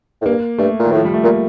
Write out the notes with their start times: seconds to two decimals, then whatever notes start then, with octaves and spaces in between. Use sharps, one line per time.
0.22 A2
0.25 G2 A#3
0.58 G2 A3
0.79 A#2
0.85 D#3
0.92 A2 F3
1.05 G3
1.14 A3
1.24 A#2 A#3